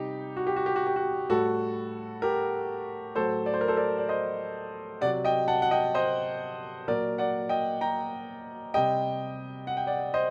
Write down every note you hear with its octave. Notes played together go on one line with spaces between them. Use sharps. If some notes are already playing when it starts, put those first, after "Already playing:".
Already playing: C3 G3 D#4 G4
F#4
G4
F#4
G4
F#4
G4
F#4
A2 G3 F#4 A4
G4 A#4
A2 F#3 A4 C5
D5
C5
A#4
A4 C5
A#4 D5
D5
C5 D#5
C3 F#3 D5 F#5
D#5 G5
F#5 A5
F#5
D#5 G5
C5 D#5
A#2 F#3 A#4 D5
D5 F#5
D#5 G5
G5 A#5
C3 G3 D#5 G5
F#5
G5
D5 F#5
C5 D#5